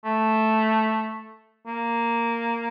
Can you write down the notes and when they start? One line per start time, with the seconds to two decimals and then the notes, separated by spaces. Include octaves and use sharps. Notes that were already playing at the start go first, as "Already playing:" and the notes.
0.05 A3
1.67 A#3